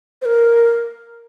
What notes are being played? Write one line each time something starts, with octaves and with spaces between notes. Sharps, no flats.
C5
A#4